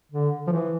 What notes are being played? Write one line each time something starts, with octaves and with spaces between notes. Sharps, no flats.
D3
F3
E3